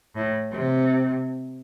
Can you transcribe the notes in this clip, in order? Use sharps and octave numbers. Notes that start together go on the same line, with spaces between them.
A2
C3